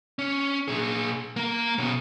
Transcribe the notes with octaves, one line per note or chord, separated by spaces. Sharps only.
C#4
A#2 G#4
A#3 A#4
B2 C#4